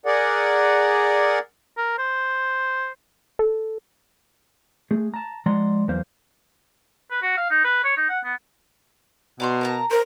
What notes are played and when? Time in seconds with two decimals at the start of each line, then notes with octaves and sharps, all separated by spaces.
0.06 G#4 A#4 D5 F#5
1.77 A#4
1.98 C5
3.39 A4
4.91 A3 G#4
5.14 A5 A#5
5.46 F3 G#3 D5 F#5 A#5 C6
5.88 E2 E3 F#3 A#3 C5 F5
7.11 B4
7.22 F#4
7.37 F5
7.50 D#4
7.64 B4
7.84 C#5
7.97 D#4
8.09 F#5
8.24 B3
9.40 B2 D5 A#5 C6
9.61 A#4 A5 A#5
9.91 A#4 C5 A#5